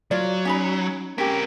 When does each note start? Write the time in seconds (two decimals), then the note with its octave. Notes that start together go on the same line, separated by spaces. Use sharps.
0.11 F#3 F4 D5
0.45 C#4 D#4 B5
1.18 C4 C#4 G4 A#4